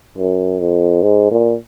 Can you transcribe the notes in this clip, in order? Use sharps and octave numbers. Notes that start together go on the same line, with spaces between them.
F#2
F2
G#2
A#2